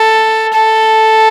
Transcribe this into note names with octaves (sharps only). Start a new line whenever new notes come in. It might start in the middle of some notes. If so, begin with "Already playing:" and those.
Already playing: A4
A4